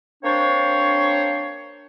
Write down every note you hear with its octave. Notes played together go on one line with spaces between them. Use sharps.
A#3 C4 D4 C5 C#5